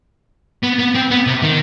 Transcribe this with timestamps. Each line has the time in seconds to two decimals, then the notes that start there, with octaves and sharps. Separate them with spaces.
0.63 B3
0.79 B3
0.95 C4
1.11 B3
1.27 C3
1.42 D#3